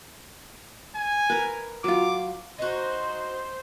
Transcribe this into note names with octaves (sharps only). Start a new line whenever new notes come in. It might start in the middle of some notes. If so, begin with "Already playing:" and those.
G#5
A#4 B4
F#3 F4 D6
D#4 F#4 C5